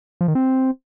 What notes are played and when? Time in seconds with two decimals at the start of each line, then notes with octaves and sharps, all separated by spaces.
0.21 F3
0.28 D#3
0.35 C4